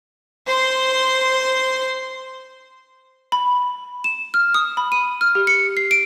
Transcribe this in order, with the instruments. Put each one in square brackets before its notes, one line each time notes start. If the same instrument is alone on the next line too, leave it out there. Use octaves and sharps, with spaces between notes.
[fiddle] C5 C6
[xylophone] B5
E7
F6
D#6
B5
D#7
F6
G4
C#7
C7
D7